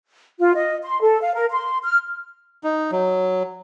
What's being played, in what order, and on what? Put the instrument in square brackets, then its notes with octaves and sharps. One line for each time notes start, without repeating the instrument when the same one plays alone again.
[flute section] F4
D#5
C6
A4
F5
A#4
C6
F6
[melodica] D#4
F#3